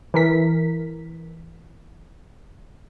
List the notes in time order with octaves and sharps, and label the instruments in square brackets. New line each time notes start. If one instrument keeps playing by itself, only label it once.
[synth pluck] E3 A#4 B6